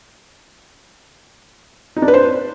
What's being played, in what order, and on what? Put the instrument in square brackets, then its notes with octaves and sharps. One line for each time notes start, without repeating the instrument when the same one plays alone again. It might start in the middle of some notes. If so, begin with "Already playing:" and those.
[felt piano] D#4
D4
B4
C5